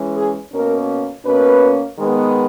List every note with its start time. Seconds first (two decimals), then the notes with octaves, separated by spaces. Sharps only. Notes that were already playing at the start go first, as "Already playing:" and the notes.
Already playing: E3 G#3 C#4
0.16 G#4
0.52 B2 A#3 C#4 A#4
1.24 B2 A#3 C#4 B4
1.98 D#3 G#3 B3